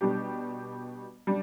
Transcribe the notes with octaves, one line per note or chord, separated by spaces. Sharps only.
B2 G3 D4 G4
G3 D4